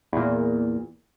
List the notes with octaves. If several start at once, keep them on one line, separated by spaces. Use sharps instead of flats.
E2 A#2